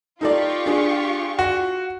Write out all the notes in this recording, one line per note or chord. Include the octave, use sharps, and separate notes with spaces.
D#4 F4 G4 A4 D5 C#6
D4 G#4
F#4